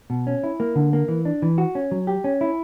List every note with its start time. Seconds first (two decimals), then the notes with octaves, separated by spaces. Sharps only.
0.10 B2
0.27 C#4
0.44 E4
0.60 A#3
0.76 D3
0.93 A#3
1.08 E3
1.25 D4
1.42 E3
1.58 F#4
1.75 C#4
1.91 F#3
2.07 G4
2.24 C#4
2.41 E4